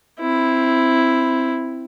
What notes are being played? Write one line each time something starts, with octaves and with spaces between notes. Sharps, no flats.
C4 E4